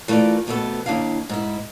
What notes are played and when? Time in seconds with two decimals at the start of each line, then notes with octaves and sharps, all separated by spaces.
0.08 E3 A3 F4 G#4 A#4 D5
0.47 F2 B2 A3 B3 A4 A5
0.86 D#2 D#3 D4 E4 F5
1.29 G#2 E4